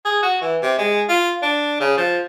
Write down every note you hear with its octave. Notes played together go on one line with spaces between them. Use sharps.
G#4
F#4
E3
C3
G#3
F4
D4
C#3
F3